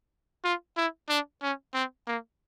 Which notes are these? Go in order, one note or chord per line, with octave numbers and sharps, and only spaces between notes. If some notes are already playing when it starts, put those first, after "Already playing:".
F4
E4
D4
C#4
C4
A#3